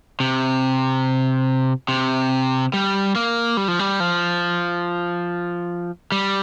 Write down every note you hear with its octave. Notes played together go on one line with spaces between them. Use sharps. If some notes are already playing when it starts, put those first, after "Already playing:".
C3
C3
G3
A#3
G3
F3
G3
F3
G3